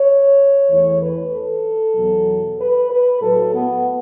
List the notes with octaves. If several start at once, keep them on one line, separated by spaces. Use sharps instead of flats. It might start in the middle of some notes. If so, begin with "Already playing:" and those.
Already playing: C#5
E2 E3 A3 C#5
B4
A4
E2 B2 F#3
B4
B4
A2 F#3 A3 A4
B3